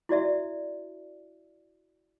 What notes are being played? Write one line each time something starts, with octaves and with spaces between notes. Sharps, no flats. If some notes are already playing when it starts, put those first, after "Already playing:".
E4 F#4 D5 E5